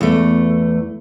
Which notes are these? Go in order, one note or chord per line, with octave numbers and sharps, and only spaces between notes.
E2 A3